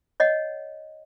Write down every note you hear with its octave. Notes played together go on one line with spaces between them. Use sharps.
C#5 D#5 F#5